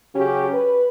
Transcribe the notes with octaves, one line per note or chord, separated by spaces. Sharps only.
C#3 F#3 C#4 G4
B4